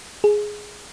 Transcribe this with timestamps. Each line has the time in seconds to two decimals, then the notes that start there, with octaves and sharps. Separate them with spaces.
0.24 G#4